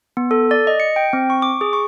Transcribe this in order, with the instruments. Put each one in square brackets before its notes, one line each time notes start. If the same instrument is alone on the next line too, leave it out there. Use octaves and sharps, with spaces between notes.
[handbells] B3
A4
D5
D#5
C#7
G5
C4
C#6
D6
G#4
C#6